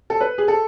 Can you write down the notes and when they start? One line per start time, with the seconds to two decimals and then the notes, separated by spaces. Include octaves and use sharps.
0.10 A4
0.20 B4
0.38 G#4
0.48 A4